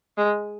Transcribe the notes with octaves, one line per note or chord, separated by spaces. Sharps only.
G#3